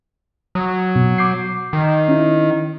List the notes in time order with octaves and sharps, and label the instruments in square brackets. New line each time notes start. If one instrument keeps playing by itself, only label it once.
[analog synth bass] F#3 [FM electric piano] D#6
[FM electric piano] B2
D6 G6 C7
[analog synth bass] D#3
[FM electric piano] C#4 E4